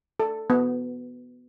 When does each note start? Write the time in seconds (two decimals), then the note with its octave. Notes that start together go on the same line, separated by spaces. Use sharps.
0.20 A4
0.50 B3